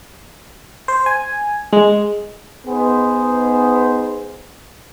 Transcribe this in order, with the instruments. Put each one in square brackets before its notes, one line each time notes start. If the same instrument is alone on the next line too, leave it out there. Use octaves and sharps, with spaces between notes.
[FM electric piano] C5
G#5
G#3
[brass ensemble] B3 D#4 G#4 C5